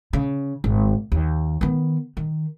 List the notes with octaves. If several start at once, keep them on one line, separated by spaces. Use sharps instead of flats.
C#3
G#1
D#2
D#3 B3
D#3